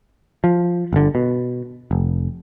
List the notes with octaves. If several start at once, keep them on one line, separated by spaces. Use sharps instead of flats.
F3
G1 D3
B2
F1